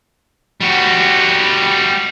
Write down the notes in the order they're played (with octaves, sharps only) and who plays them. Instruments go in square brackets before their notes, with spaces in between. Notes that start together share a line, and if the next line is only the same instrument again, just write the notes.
[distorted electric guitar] G3 F#4